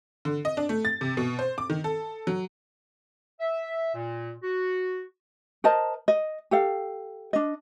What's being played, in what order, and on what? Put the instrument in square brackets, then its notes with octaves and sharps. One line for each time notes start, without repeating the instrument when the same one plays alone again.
[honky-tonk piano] D3
D#5
D4
A3
A6
C3
B2
C5
D6
D#3
A4
F#3
[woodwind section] E5
A#2
F#4
[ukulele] A#4 C5 D#5 A5
D#5
G4 A4 F5
D4 D#5